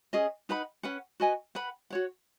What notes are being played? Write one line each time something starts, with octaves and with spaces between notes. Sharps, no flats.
C#4 G#4 D#5 G#5
D#4 B4 F#5 B5
C#4 B4 F#5
F#4 B4 D#5 G#5
B4 F#5 B5
F#4 C#5 F#5